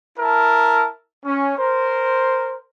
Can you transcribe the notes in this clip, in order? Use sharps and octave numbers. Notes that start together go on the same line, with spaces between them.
E4 A#4 A5
C#4
A#4 C5